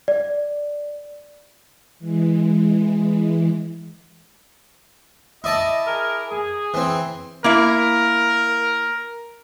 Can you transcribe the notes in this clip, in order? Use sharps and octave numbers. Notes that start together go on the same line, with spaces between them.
D5
E3 G#3
E4 D5 D#5 A5
G#4 A#4
G#4
E3 C4
A#3 E4 A#4 E5